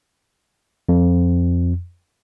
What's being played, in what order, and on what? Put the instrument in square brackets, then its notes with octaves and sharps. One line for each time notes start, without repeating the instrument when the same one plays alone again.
[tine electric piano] F2